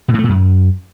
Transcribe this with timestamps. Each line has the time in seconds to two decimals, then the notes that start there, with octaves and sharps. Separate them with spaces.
0.08 B2
0.14 A2
0.19 A3
0.24 A#2
0.29 F#2